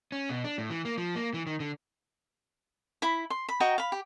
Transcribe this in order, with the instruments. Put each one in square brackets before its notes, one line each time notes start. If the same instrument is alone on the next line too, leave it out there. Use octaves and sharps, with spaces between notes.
[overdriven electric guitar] C#4
B2
D4
A2
E3
A#3
F3
A#3
E3
D#3
D3
[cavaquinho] E4 B5
C6
B5
F#4 D#5 G5 A#5
F5 B5
G4